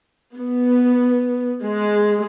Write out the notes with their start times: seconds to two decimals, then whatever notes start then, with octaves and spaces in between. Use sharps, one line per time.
0.35 B3
1.63 G#3